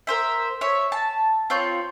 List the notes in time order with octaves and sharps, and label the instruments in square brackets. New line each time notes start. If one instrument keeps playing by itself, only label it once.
[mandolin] A#4 C5 E5
C#5 E5
A5
C4 F4 C#5 G6